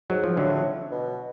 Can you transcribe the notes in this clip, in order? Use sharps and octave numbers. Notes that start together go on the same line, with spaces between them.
G#2 F#3
F3
A2 D3 F#3
B2